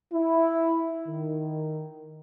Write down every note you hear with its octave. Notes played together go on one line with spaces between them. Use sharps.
E4
D#3